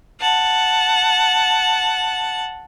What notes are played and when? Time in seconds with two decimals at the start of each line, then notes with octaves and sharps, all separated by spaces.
0.21 F#5 A5